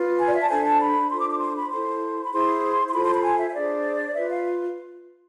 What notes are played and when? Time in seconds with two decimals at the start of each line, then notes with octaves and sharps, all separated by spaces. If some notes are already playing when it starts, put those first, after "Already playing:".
Already playing: F4 B4
0.17 G#5
0.27 D5
0.34 E5
0.41 A5
0.49 D4 A4 C5 G#5
0.64 A5
0.79 B5
1.09 D4 F4 A4 C5 C6
1.19 D6
1.30 D6
1.40 C6
1.55 B5
1.70 E4 A4 C5 C6
2.25 B5
2.32 E4 G#4 C5 C6
2.88 C6
2.93 F4 A4 C5 B5
3.03 C6
3.13 B5
3.23 G#5
3.39 E5
3.50 E5
3.54 D4 G#4 C5 D5
4.15 F4 B4 E5
4.30 F5